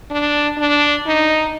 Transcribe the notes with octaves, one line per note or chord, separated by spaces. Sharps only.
D4
D4
D#4